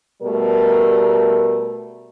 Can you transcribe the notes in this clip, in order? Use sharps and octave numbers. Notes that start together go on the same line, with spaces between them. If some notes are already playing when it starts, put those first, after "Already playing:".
B2 G3 A3 A#4